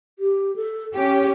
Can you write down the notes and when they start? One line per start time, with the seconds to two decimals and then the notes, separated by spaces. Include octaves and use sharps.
0.19 G4
0.56 A4
0.94 C#4 G4 G5